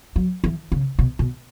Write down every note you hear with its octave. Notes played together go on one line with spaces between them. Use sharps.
F#3
E3
C#3
B2
B2